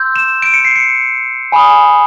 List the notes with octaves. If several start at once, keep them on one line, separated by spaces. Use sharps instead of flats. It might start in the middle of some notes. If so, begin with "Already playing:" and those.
Already playing: C6 E6 G6
E7
D7
C#7
C7
C#7
G#5 B5 D#6